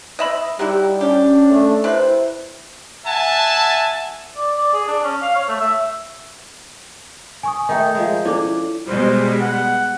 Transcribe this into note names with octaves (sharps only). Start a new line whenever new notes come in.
D#5 E5 B5
F#3 G3 D#4 E4 G4
C#4 D4 G4
A3
C3 E4 B4 C5
E5 F#5 G#5 A5
D5
D5
G#4
D4
C#4
F5
C#5
A3
E5
G#5 C#6 D#6
D#3 A3 E5 G5 D#6
F3 G#3
C#4 D4 E4 A4 D6
B2 G3 G#3 C5
F#5